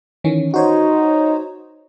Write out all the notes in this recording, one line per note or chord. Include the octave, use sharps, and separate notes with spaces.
D#3 E3 C#4
D#4 F#4 C5 C#5